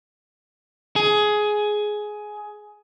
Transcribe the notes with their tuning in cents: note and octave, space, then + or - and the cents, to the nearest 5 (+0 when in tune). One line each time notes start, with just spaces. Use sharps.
G#4 +15